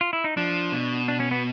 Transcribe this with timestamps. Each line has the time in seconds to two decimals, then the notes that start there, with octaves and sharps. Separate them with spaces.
0.01 F4
0.13 E4
0.24 D#4
0.37 F3 D4
0.72 B2
1.08 D4
1.20 C#4
1.31 B3